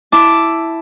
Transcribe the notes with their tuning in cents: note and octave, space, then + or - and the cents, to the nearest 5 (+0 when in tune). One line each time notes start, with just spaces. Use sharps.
E4 +0 A5 +0 D6 +0